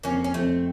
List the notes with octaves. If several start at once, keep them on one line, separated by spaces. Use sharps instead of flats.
F2 A#3 C#4
C#4
F2 A3 C4